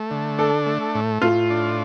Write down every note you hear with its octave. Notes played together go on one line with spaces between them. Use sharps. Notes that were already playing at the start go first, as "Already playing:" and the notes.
Already playing: A3
D3
D4 A4
A3
A2
A2 F4
D4